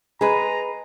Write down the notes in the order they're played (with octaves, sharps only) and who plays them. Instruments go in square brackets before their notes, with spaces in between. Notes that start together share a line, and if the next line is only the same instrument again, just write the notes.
[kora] G#3 [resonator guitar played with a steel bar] G#4 B4 [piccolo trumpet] A#5